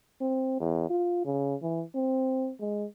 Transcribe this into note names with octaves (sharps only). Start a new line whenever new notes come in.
C4
E2
F4
C#3
E3
C4
G#3